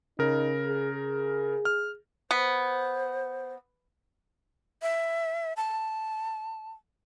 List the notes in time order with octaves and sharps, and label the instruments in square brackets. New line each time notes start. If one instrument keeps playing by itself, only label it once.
[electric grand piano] C#3 A#4 [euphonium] D#4
[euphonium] G#4
G#4
[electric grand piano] F6
[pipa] B3 [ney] C5
[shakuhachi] E5
A5